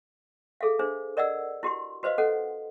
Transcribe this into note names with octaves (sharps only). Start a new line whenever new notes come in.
G#4 A4 E5 F5
D4 G#4 C5
A#4 D5 D#5 F#5 E6
E4 F#4 G4 C6
F#4 B4 C5 D#5 F5
C#4 A4 D#5 F#5